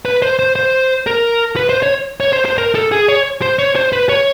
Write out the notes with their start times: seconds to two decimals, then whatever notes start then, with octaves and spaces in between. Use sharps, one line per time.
0.05 B4
0.22 C5
0.39 C5
0.56 C5
1.07 A#4
1.56 B4
1.69 C5
1.83 C#5
2.20 C#5
2.33 C5
2.45 C5
2.58 A#4
2.75 A4
2.92 G#4
3.09 C#5
3.42 C5
3.59 C#5
3.76 C5
3.93 B4
4.09 C#5